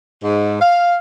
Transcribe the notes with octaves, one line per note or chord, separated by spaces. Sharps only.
G#2
F5